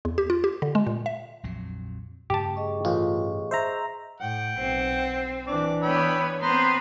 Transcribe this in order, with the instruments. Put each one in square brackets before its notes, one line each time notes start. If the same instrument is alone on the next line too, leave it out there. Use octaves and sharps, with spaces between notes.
[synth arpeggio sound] E2
G4
F4
G4
D3
G#3
A#2
E5
[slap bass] A#1 F2 F#3
[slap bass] G2 C#3 A3 [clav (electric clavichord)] G4 A5
[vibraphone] G#4 D#5 C#6
[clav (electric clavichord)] A1 [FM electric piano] F4
[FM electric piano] C5 E5 A#5
[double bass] A2 [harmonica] F#5 G5
[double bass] B1 [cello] C4
[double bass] E3 D4 [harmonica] D5
[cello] B3 C#5 [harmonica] G5 B5 E6
[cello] B3 C4 [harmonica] C5 A#5 C6